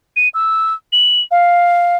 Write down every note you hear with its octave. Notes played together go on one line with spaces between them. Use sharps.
D#7
E6
F#7
F5